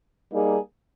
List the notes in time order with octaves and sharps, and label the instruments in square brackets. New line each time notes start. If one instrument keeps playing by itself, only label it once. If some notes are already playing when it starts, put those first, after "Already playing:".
[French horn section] G3 A#3 D#4 G#4